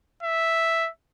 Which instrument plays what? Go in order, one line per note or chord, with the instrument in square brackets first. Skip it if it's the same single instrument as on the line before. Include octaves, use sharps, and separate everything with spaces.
[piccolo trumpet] E5